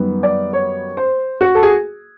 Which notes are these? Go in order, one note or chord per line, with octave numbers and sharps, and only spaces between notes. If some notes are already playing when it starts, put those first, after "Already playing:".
Already playing: F#2 D#3 G3 B3
D5
C#5
C5
F#4
A4
G#4